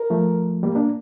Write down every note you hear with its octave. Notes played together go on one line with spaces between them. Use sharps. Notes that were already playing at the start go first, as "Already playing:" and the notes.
Already playing: A#4
F3 A3
G3 A#3
A#3 D4